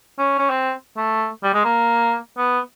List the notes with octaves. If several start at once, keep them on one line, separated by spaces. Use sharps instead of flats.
C#4
C#4
C4
A3
G3
G#3
A#3
B3